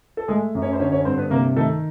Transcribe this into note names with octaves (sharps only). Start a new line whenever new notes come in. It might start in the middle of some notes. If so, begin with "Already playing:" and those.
A4
G#3 A3 G#4
F#2
C#4 C#5
C5
D3 C#4 C#5
C#4 C#5
G2 C4 C5
B3 B4
C3 A#3 A#4
D#3 A3 A4